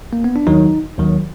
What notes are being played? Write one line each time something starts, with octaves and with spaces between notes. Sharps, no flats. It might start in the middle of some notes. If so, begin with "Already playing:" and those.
A#3
B3
D4
D#2 D#3 F#3 D#4
D#2 D#3 F#3